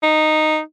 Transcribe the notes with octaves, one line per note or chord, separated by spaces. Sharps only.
D#4